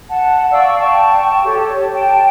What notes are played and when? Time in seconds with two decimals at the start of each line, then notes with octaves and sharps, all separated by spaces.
0.09 F#5 A5
0.51 D5 F5 C#6 E6
0.79 G5 A5 C#6
1.45 G4 A4 C#5
1.92 G5 A5